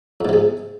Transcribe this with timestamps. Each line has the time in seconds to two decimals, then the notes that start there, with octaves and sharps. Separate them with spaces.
0.21 F2
0.25 G#2
0.29 C3
0.33 G#3